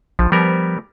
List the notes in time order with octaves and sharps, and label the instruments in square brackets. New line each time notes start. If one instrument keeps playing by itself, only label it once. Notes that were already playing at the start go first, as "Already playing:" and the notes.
[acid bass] A#1 [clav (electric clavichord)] F3
[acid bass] F3 [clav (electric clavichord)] G3 B3 A#4